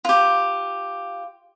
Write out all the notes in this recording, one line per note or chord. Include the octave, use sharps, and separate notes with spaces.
F4 G4